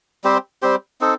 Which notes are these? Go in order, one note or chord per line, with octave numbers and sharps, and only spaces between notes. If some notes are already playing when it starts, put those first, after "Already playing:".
G3 C4 G4 C5
G3 C4 G4 C5
C4 D#4 A4